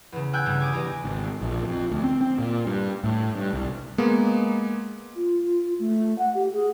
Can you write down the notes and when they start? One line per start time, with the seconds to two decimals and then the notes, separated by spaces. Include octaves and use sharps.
0.12 E2 C#3
0.33 G5 G#5 E6 F#6 G6
0.46 G2 C#3 G3
0.60 G#5 D6 D#6
0.73 E2 G4 D#5
1.04 G#1
1.41 A#1
1.66 F2
1.91 D2
2.04 C4
2.21 C4
2.39 A#2
2.67 G2
3.04 A2
3.35 G2
3.53 C2
3.98 G#3 A#3 B3
5.14 F4
5.79 A3
6.19 F#5
6.35 G4
6.53 G#4